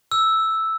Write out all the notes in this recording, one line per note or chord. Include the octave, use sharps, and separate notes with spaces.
E6